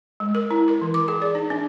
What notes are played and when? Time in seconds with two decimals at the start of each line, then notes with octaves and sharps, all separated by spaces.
0.20 G#3
0.35 A#4
0.51 E4
0.68 A#4
0.81 E3
0.94 D6
1.08 G#4
1.22 D5
1.35 D#4
1.50 D4